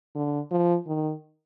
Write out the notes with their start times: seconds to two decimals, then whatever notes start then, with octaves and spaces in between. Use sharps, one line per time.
0.15 D3
0.51 F3
0.87 D#3